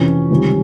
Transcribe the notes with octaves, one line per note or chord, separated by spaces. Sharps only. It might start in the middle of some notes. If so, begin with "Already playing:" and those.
Already playing: F2 C3 E3 C#4
C#2 C3 D#3 G3